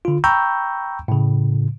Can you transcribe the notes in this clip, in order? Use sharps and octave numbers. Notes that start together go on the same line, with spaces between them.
D3 F4
G5 A#5 B5 C#6 E6 G6
A2 C#3